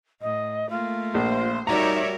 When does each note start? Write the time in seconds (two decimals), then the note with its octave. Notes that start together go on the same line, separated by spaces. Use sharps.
0.21 A2 D#5
0.69 A3 A#3 F4
1.14 A#1 C5
1.67 G3 D#4 F#4 A#4 C#5 D5 E5 A#5